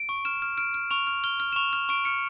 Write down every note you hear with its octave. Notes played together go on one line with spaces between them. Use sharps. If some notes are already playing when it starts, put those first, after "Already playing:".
Already playing: D7
C#6
F6 E7
F6
F6 D7
F6
C#6 F7
F6
F6 G7
F6
E7
C#6 F7
F6
C#6 D7
F6 C#7